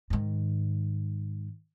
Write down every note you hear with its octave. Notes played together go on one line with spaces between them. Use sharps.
G#2 D#3